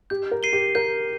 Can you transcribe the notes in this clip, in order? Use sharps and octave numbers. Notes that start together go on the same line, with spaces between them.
G4 G6
A#4
C7 D#7 G7
G4
A#4 G6